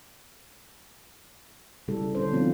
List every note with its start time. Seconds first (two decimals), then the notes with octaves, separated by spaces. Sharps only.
1.88 C#3 G3 E4 A4
2.15 D3 C#4 C5
2.32 F3 B3 C4 D#4 F4